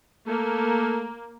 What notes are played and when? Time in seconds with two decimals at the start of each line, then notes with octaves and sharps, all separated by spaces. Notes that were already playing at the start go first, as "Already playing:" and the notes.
0.27 A3 A#3